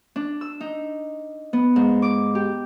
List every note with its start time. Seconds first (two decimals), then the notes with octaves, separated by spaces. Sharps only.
0.16 D4
0.41 E6
0.60 D#4
1.53 B3
1.76 G#2
2.02 D6
2.35 G4